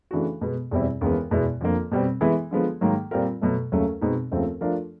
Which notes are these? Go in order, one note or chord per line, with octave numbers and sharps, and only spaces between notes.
C#3 E3 A3 D4 F#4
B2 G#3 B3
E2 B2 G3 C4 E4
D#2 C#3 E3 G#3 B3
E2 B2 G#3 B3 E4
F2 D3 F3 A#3
B2 G3 C4
E3 G#3 B3 E4
D3 F3 G#3 B3
G#2 D#3 F#3 A#3
A#2 G3 C4 F4 A#4
B2 F#3 A3
D#2 C#3 F#3 A3 C#4
B2 G#3 C4 D#4
D#2 C#3 F3 A3 C4
F3 A3 D4 F4 A#4